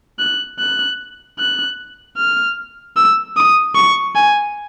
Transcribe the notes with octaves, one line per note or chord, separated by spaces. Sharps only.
F#6
F#6
F#6
F6
E6
D#6
C#6
G#5